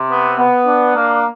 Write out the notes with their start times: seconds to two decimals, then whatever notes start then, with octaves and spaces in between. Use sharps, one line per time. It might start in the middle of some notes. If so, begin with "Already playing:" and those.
Already playing: C3
0.08 B3
0.38 B3
0.66 D4
0.95 A#3